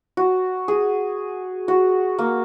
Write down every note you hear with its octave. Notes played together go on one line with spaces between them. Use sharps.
F#4
G#4
F#4
A#3